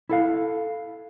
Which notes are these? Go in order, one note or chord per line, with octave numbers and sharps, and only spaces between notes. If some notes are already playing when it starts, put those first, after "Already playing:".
E4 A4 F5